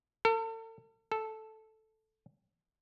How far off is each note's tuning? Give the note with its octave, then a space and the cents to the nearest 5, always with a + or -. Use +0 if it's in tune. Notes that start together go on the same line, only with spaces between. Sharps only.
A4 +40
A4 -5